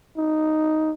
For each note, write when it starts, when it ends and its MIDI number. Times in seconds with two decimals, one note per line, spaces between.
0.18 0.91 63